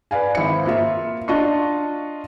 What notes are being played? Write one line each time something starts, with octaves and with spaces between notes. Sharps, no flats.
B4 D5 F5 G#5
G#1 E4 C5 C#7
A#3 F4 E5
D4 F4 D#5 F5 A5 C#6